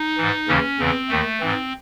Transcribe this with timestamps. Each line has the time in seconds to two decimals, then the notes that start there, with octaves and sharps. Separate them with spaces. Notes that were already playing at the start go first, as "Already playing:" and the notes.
Already playing: D#4
0.18 G#2 E3
0.48 D#2 C#3 E3 C#4
0.79 E2 C#3 E3 C4
1.09 D#2 D#3 A3
1.40 G#2 E3 C4